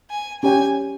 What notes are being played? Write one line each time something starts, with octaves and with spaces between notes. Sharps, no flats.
G#5
C#4 G4 C#5 G5 G#5